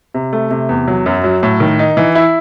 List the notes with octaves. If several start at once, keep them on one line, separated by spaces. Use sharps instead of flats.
C3
A3
C3
E2
F#3
F#2
F#3
A2
D#3
D#4
E3
E4